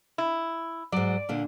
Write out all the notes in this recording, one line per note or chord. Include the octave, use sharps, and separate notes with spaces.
E4
G#2 F#3 D5
A#2 D3